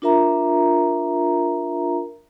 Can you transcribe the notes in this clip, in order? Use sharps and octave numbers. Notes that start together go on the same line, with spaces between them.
D4 F4 A#4 E5 A#5